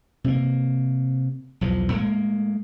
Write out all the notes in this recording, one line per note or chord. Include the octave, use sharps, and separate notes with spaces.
C3 A#3
B1 E2 F3
A2 G#3 A#3